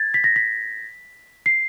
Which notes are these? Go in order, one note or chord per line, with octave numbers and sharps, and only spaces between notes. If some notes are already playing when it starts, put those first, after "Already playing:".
Already playing: G#6 A6
B6
A#6
B6
C7